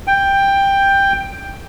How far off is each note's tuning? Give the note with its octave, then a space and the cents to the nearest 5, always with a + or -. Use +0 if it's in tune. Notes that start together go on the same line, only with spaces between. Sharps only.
G5 +10